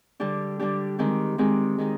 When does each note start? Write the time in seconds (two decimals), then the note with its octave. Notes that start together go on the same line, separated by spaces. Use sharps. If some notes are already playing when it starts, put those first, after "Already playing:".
0.20 D3 G3 D4 G4
0.60 D3 G3 D4 G4
0.99 D#3 G#3 C4 G4
1.38 D#3 G#3 C4 G4
1.78 D#3 G#3 D#4